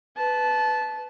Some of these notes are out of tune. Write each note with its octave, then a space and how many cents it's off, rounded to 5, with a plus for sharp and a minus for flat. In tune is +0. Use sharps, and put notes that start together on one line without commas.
B4 +10 A5 -20